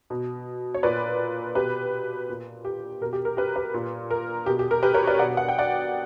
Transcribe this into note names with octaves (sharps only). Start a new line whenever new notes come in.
B2
C#5
A#2 B4 D5
B2 G4 B4
A#2
G4
B2 A#4
G4
A#4
G4 B4
G4 B4
A#2
A#4
B2 G4
G4
A#4
G4 B4
A#4 C#5
B4 D5
B2 D5 F#5
F#5
G5
D5 F#5